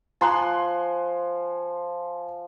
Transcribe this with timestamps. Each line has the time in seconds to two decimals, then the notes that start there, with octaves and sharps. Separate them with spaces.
0.21 F3 G#5 C6 F#6